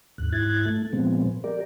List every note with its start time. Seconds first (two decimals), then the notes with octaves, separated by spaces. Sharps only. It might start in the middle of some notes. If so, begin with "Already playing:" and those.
0.18 D#2 G#2 F#6
0.32 G#2 E4 F#6 G#6 A6
0.65 A3
0.93 A#2 F3 G#3 B3 C4
1.44 G4 A#4 D5